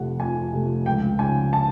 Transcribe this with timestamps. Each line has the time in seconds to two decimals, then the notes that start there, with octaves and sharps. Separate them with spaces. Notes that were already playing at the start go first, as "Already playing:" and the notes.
Already playing: F2 C3 F3 A3 F#5
0.20 F2 G#5
0.53 C3 F3 A3
0.86 C#2 G5
1.19 C#3 F3 G#5
1.53 A5